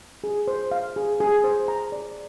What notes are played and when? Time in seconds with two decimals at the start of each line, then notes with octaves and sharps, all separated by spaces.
0.24 G#4
0.48 C5
0.71 F5
0.96 G#4
1.20 G#4
1.44 C5
1.68 A#5
1.92 D5